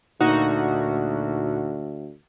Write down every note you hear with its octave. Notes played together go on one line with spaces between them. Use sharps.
D2 A#2 D#4 F#4